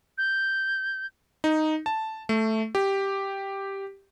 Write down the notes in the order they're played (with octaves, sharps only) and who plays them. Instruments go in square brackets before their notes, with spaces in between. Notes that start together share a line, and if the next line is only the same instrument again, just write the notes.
[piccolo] G6
[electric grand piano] D#4
A5
A3
G4